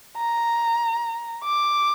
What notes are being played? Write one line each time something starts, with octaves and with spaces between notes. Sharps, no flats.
A#5
D6